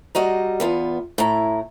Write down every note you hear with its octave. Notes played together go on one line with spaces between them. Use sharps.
G3 F#4 D#5 A#5
E2 B3 F4
A2 E4 A#5